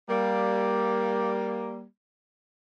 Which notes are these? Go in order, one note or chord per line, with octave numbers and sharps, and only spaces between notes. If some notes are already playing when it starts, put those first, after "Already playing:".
G3 A#3